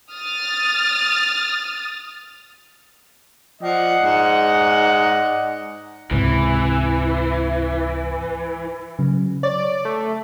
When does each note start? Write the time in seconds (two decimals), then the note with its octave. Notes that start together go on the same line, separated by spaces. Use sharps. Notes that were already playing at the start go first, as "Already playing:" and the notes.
0.12 D#6 F6 A6
3.62 F3 D5 D#5 F#5
4.03 G#2
6.11 C#2 G#2 C3 E3
8.99 C#3 F#3
9.43 C#5 D5
9.85 A3